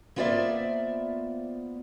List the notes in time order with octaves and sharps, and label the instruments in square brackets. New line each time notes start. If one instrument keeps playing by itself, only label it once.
[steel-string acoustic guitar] A#3 B3 F4 C5 D5 E5